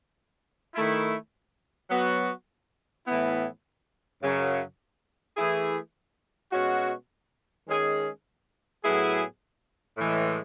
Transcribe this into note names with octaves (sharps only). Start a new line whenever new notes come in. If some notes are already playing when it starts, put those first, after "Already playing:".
D#3 A3 E4
F#3 B3 F#4
A2 E3 B3 E4
F#2 C#3 F#3
E3 A3 E4 G#4
B2 G#3 C#4 F#4
D#3 G#3 C#4 G#4
A2 F#3 B3 E4 G#4
A2 E3 G#3